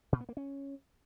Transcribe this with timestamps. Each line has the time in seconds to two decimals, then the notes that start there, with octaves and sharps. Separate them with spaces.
0.12 A#2
0.21 B3
0.29 A#3
0.37 C#4